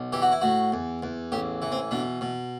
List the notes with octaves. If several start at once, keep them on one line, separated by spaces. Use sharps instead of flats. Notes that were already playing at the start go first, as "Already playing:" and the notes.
Already playing: B1
E3 G4
F#4
E4
A2 F#4
E2
E2
A1 G4
E3
C4
B2 D4
B2